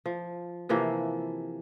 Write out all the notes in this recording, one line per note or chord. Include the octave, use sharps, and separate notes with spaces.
F3
C3 E3 F3 A#3